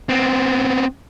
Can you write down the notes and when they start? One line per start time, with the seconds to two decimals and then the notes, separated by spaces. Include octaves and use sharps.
0.09 B3 C4